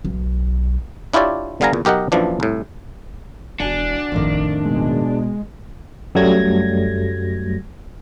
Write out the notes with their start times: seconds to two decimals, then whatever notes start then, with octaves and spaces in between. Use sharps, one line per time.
0.05 B1
1.13 D4 E4 F4 G4 C#5 D5
1.61 D3 G3 B3 F5 G#5 A#5
1.73 E2 A#2
1.85 B1 G4 A#4 D#5 F#5
2.12 A#1 F#2 E3 F3 D4
2.40 C2 A2
3.60 E1 D4 F#4 G#5
4.12 G#1 F2 A2 D#3
4.65 B2 G#3
6.15 F#2 F#3 G3 A3 G#6 A#6